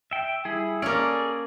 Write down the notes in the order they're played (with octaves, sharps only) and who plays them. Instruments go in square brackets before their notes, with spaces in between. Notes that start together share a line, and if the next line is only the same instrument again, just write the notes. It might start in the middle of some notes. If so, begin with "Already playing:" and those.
[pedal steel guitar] E5 G5
G3 E4 G#4
[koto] A#3 C#4 [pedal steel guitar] G#4 A4 D5